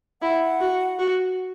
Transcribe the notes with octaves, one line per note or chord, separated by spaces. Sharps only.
E4 F#5
F#4
F#4